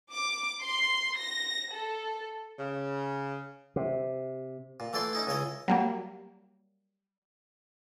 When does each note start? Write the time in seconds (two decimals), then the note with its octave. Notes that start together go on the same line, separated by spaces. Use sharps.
0.12 D6
0.62 C6
1.18 A#6
1.72 A4
2.59 C#3
3.76 C3
4.80 A#2
4.93 E3 A3 E4 D5 C6
5.13 C#4 D#4 E4
5.27 C#2 C#3 E4 C#5 D#5
5.68 F#3 G3 A#3